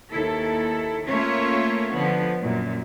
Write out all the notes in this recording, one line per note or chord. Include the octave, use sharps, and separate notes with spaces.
D#2 E4 A4
A3 A#3 C#4 F4 C#5 E5
D3 F3 B3
F#2 A#2